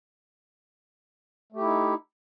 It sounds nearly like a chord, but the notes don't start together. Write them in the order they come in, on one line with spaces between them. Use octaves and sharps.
A3 G4 E4 D#4